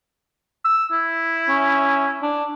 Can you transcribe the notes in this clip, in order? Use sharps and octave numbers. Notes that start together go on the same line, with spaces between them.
E6
E4
C#4
D4